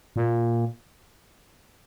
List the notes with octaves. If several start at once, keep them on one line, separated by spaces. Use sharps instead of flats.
A#2